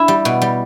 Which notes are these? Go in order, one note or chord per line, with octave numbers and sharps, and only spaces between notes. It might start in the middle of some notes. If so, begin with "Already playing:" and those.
Already playing: D4 E4
G3
B2
G3